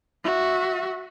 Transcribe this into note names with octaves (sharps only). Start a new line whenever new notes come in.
F#4 E5